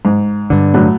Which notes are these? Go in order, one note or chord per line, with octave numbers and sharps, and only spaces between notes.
G#2
G2 D3
A2 F#3